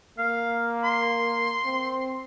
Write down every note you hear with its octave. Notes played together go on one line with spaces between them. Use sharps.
A#3 F5
C6
C4